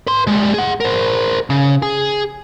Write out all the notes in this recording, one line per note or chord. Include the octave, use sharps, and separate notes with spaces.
B4 C6
G3 G#3
G#4 F#5
A#4 C5
C#3
G#4